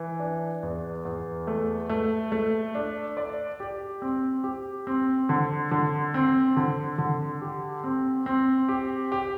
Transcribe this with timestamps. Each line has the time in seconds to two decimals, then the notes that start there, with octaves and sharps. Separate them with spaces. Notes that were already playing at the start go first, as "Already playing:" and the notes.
Already playing: E3
0.20 D4
0.63 E2
1.05 E2
1.47 A3
1.89 A3
2.32 A3
2.75 D4
3.17 D5
3.60 G4
4.02 C4
4.44 G4
4.87 C4
5.29 D3
5.71 D3
6.14 C4
6.57 D3
6.98 D3
7.42 G4
7.84 C4
8.26 C4
8.69 G4
9.12 G4